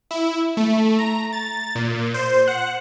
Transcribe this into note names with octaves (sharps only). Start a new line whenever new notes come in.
E4
A3
A#5
A6
A#2
C5
F#5